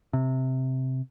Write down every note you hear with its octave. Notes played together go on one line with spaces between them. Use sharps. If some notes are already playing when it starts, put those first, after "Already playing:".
C3